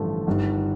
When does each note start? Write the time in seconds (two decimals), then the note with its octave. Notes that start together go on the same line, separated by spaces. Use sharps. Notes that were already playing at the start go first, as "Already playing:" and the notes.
Already playing: A1 G2 D3 F3 A3
0.27 G1 G2 D#3